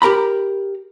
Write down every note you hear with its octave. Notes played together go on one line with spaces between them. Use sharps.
G4 A#4 A#5 B5